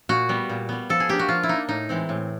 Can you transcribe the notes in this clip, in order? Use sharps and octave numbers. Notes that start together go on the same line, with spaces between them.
A#2 F#4
G3 B3
A#2
G3 B3
F3 A4
G#4
A#3 D4 G4
F#4
F3 F4
E4
A#3 D4 D#4
A2 D#4
E3 G#3 C4
A2